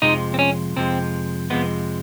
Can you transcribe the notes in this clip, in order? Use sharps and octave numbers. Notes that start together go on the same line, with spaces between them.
F2 C3 F3 G#3 D#4
C4
C#4
F2 C3 F3 G#3 C4
F2 C3 F3 G#3 B3